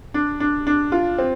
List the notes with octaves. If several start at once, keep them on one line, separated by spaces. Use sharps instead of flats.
D4
D4
D4
F4
C4